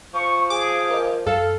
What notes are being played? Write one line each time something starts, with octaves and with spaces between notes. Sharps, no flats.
F3 C#6
G#4 D6
A#4 D#5
F#2 A4 F5